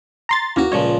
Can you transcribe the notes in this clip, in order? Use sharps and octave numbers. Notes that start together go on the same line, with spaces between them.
A#5 C6 A6
D#2 E3 A#3 C#4 F#4
C#2 A#2 F3 C#5